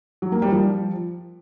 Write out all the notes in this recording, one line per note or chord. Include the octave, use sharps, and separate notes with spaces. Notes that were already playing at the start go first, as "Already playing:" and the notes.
F#3
A#3
G3
F3